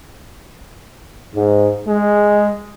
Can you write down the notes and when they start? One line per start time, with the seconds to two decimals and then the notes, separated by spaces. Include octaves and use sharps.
1.35 G#2
1.87 G#3